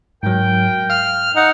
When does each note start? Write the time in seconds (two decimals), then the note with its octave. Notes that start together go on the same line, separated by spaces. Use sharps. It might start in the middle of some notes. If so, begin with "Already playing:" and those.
0.23 G#2 F#3 A#4 G5
0.90 F5 F6
1.36 D#4 F#5